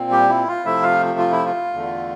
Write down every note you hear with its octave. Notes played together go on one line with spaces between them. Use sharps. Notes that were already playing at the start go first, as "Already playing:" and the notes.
Already playing: A#2 C4
G3 G4
E4
F4
C3 F3 A3 E4 E5
F4 F5
F4
E4
F4
E2 D3 A3